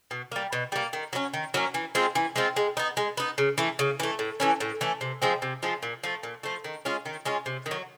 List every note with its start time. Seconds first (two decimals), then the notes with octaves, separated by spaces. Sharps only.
0.11 B2
0.32 G3 A#3
0.53 B2
0.72 G3 A#3
0.93 D#3
1.13 F#3 A#3 C#4
1.34 D#3
1.54 F#3 A#3 C#4
1.74 E3
1.95 G#3 C4 F4
2.15 E3
2.36 G#3 C4 F4
2.56 G#3
2.77 B3 D#4
2.97 G#3
3.17 B3 D#4
3.38 C#3
3.58 E3 A3
3.79 C#3
4.00 E3 A3
4.19 A2
4.40 E3 A3 C#4
4.60 A2
4.81 E3 A3 C#4
5.01 C3
5.22 F3 G#3 C4
5.42 C3
5.63 F3 G#3 C4
5.83 A#2
6.04 F3 A3
6.23 A#2
6.43 F3 A3
6.64 D#3
6.85 G#3 C#4 F4
7.06 D#3
7.25 G#3 C#4 F4
7.46 C3
7.66 D#3
7.71 F#3